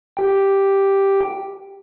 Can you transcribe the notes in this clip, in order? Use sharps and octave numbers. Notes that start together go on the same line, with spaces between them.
G4 G5